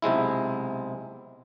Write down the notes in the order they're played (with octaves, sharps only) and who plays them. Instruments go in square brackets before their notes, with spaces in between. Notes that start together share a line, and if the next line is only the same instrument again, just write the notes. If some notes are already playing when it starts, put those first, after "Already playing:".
[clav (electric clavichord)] B1 C3 G#3 E4